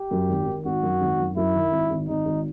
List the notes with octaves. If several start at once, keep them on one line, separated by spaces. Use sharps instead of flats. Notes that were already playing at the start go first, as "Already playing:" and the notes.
Already playing: G4
F#2
G#1
D#3
G#1 F#4
F#2
G#1
F#2
F#2 E4
D#3
G#1
G#1
G#1 D#4
G#1